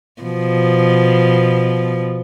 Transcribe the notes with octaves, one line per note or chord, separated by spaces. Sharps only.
B2 F3